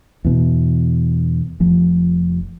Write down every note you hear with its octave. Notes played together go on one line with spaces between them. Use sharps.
E2 B2
F1 F3